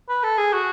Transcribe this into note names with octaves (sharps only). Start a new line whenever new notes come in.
B4
A4
G#4
F#4